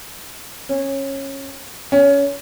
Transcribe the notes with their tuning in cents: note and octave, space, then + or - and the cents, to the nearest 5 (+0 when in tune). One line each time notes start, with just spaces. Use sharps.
C#4 -20
C#4 +20